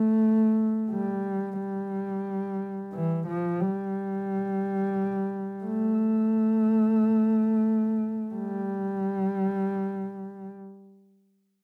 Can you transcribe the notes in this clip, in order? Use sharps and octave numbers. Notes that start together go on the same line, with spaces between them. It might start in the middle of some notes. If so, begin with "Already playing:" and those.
Already playing: A3
G3
G3
E3
F3
G3
A3
G3